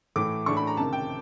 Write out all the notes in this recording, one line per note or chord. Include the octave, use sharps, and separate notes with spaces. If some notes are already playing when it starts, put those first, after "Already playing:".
A2 E3 A3 D6
A2 E3 A3 D4 C#6
B5
A#5
C#2 C3 D#3 A5
G5